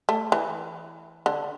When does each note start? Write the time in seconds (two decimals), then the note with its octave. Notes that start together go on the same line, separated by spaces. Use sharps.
0.09 A3
0.32 E3
1.26 D3